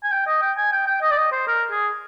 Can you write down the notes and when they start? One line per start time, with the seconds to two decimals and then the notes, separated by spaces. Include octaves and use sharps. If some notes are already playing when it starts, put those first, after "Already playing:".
0.04 G#5
0.11 G5
0.27 D#5
0.42 G5
0.58 G#5
0.72 G5
0.87 G5
1.02 D#5
1.11 D5
1.17 D#5
1.32 C5
1.47 A#4
1.71 G#4